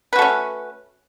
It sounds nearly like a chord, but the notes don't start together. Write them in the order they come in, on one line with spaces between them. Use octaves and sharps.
B4 F#4 A3 C#4